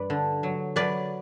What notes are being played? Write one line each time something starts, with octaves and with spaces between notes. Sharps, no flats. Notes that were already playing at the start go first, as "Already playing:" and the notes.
Already playing: G2 B4 D5
D3
F#3
F#3 B4 D5